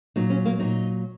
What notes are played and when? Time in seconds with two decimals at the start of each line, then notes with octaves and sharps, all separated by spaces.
0.16 A#2 F#3 D#4
0.30 C#4
0.45 A#3
0.59 A#2 F#3 D#4